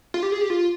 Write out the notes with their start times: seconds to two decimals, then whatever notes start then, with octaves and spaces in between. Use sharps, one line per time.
0.14 F4
0.23 G4
0.32 G#4
0.41 G4
0.50 F4